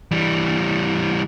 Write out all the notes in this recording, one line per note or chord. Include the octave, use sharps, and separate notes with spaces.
E3 G3